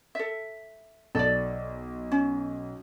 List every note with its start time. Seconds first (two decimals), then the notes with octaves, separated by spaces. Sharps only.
0.15 A4 E5
1.15 B1 A4 D5
2.12 C#4